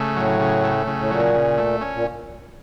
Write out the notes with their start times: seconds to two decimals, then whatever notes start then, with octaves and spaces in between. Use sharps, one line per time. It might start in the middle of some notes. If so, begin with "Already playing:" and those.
Already playing: C#3 A3
0.16 A2 F#3
0.40 C#3
0.63 A3
0.87 C#3
0.99 A2
1.10 A#2 F#3
1.34 C#3
1.58 A3
1.81 C#4
1.95 A#2